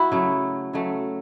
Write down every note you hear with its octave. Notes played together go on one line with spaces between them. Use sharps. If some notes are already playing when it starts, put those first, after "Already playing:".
Already playing: E4 F#4
C#3 F#3 A3
C#3 F#3 A3